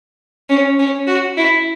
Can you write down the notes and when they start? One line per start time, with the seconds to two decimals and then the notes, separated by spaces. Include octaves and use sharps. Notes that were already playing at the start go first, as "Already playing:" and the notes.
0.49 C#4
0.79 C#4
1.07 F#4
1.37 E4